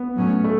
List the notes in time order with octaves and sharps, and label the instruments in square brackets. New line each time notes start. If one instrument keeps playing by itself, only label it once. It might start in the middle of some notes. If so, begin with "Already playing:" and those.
Already playing: [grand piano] B3
[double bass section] A2 F#3 A3 C#4
[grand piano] A3